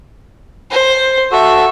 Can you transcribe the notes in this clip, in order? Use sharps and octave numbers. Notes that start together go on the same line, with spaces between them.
C5
F#4 A4 E5